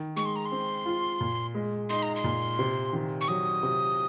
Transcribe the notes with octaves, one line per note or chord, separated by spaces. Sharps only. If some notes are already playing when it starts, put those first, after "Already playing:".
Already playing: D#3
G#3 C#6
C6
A#5
C6
C4
F4
A#2
G#3
D#4 C6
A#5
C6
A#2
C3
D#3
C#6
F#3 D#6
C3